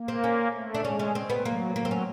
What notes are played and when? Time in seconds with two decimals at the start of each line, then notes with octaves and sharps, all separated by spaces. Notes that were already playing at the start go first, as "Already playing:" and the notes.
Already playing: A#3
0.08 C4
0.24 C#4
0.54 A3
0.74 D4
0.84 G#3 C#4
0.99 C#4
1.15 C4
1.30 B3
1.45 F#3 A#3
1.76 F#3 A#3
1.85 C4
1.91 C#4